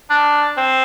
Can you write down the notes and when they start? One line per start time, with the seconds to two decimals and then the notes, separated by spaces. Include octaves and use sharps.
0.10 D4
0.57 C4